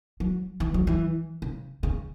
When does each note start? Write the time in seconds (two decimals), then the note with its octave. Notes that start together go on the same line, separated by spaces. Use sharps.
0.20 F#3
0.60 E3
0.74 F#3
0.87 E3
1.42 C#3
1.83 C#3